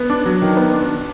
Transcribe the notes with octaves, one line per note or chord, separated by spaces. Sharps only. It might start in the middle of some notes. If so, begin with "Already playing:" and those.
Already playing: B3
D4
F#3
D#3
B3
D4
D4